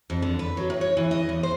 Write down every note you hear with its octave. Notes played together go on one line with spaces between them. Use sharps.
F2
D3
B4
F#3
A2
C#5
E3
D#5
E2
C5